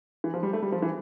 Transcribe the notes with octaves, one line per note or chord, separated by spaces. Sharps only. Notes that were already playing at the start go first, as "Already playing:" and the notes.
E3
F3
G3
A3
G3
F3
E3